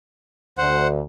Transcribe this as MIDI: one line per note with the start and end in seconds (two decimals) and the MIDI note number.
0.58 1.01 38
0.58 0.87 72
0.58 0.87 78